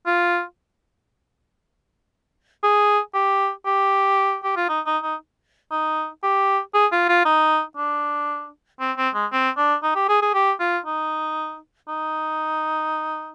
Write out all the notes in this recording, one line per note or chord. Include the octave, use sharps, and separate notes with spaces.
F4
G#4
G4
G4
G4
F4
D#4
D#4
D#4
D#4
G4
G#4
F4
F4
D#4
D4
C4
C4
G#3
C4
D4
D#4
G4
G#4
G#4
G4
F4
D#4
D#4